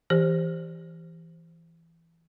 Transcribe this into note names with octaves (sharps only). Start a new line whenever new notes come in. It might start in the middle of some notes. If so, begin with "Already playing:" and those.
E3 G4 C5